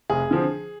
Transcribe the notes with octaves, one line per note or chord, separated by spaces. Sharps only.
F1 G#4
D3 F3 C4